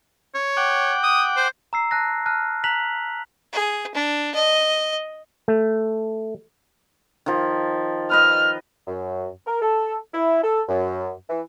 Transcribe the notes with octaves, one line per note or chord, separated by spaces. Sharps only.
C#5
F#5 G5 D6
D#6
C5
A#5 E6 C7
A5 F#6 A#6
A5 F6 F#6
A#5 F#6 B6 F7 F#7
G#4
D4
D#5
A3
D#3 F3
B4 D#5 F6
F#2
A#4
A4
E4
A4
F#2
E3